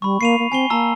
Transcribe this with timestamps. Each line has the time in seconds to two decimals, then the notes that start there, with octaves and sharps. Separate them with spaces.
0.02 G3 B5 C#6
0.21 A#3 C7 D#7 F7
0.39 A#3
0.52 C4 G#5 C7 G7
0.70 A#3 A5 A#5 E6